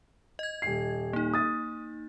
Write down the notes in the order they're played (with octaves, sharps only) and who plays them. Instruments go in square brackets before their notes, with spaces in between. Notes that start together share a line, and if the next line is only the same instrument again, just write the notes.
[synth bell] D#5 G#6
[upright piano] D#1 C7
[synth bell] A#3 D#4
[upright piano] D#6 A6